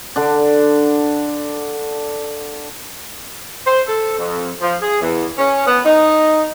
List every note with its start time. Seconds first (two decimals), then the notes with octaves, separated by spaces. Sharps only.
0.16 D3 D4
3.66 C5
3.87 A4
4.18 F2
4.62 F3
4.81 G#4
5.02 E2
5.38 C#4
5.67 B3
5.85 D#4